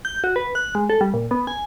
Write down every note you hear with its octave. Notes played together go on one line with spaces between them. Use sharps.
G6
F#4
B4
F#6
G#3
A4
G3
A#2
B3
G#5